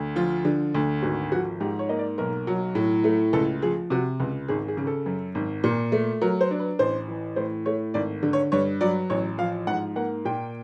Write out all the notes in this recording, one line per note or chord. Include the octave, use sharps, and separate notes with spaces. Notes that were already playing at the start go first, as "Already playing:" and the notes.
Already playing: D2
F3 F4
D3
D2
G#1 F#4
F3 F#4
G#2 G4
C#5
A#3 D#5
D5
B1 A#4
F#3
A2
A3
C#2 A4
F3 G#4
C3 F#4
C#2
G#1 G#4
G#4
C#3
A4
F#2
G#1
A#2
A3
F#3 A#4
C5
D4
B4
A1 C5
E3
A2 C5
A3 C#5
G#1 D5
D3
C#5
G2 C#5
F#3 D5
A1 C#5
F3 F5
G#2 F#5
A#3 F#5
A#2 G5